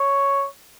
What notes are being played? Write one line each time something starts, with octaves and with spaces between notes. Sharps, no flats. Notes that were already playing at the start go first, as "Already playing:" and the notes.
Already playing: C#5